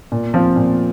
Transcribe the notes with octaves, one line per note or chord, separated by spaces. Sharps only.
A#2
F3 C4 F4
A#2